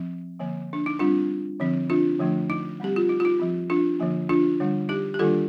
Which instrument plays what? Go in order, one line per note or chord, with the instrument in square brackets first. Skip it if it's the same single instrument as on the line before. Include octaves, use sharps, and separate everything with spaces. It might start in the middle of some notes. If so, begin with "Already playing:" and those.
Already playing: [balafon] F3 C4
D3 F3 A#3
D4
D#4
G3 C4 D4 F4
D3 F3 C4
D4 F4
D3 F3 A3 D4
D#4
G3 C4 G4
F4
D#4
F4
D#4
F3 C4
D4 F4
D3 F3 A#3
D4 F4
D3 G3 D4
D#4 G4
G4
D#3 G3 A#3 D4 F4 A4